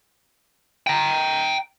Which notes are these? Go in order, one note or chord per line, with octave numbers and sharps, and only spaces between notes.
G5 A#5